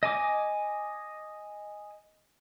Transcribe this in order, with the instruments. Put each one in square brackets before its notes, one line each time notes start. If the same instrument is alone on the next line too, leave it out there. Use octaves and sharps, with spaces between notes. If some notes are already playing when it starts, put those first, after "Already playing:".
[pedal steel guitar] D#5 G#5 D6